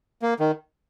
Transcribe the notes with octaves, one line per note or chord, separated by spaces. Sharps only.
A#3
D#3